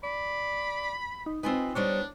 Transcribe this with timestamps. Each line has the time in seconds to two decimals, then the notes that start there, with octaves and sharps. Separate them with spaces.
0.03 D5 B5
1.26 D#4
1.43 C4 D#4 F4 B4 G#5
1.75 G3 B3 D4 D#4 C5 C#5